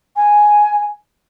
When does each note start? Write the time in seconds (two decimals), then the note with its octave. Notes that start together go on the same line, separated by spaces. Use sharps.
0.16 G#5